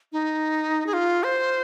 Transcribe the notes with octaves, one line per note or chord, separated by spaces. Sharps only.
D#4
G#4
F4
C5